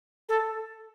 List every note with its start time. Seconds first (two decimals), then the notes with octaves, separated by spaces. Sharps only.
0.29 A4